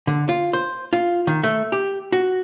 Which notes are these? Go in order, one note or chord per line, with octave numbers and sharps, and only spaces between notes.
D3
F4
C5
F4
D#3
A3
G4
F#4